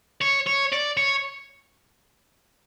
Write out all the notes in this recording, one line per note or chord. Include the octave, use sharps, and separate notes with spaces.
C#5
C#5
D5
C#5